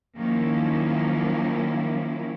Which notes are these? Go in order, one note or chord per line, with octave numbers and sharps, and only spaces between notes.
D#3 F3 F#3 A#3 C#4 E4